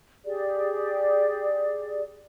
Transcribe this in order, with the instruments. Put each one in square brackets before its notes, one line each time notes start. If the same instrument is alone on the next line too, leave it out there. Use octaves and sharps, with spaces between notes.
[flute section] G4 G#4 D5